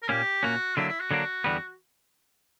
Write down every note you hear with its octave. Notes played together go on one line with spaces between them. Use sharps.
A#4
A#2 A#3 C#4 G4
A#2 A#3 C#4 F#4
D3 F#3 A#3 D4 E4
E4
F#4
D3 F#3 A#3 D4
E2 D3 G3 B3